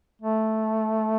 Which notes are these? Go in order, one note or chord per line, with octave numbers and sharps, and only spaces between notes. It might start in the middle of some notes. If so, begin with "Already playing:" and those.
A3